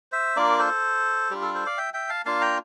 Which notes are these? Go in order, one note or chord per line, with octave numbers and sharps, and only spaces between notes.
C5 E5
A#3 D4 F4 A#4 D5
A4 C5
G3 D4 F4 G4
A4
A4 C5
D5 F5
E5 G5
E5 G5
F5 A5
A#3 D4 F4 F5 A5
G5 A#5